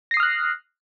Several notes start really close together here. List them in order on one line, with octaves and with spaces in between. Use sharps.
A#6 C7 D#6 F6 F#6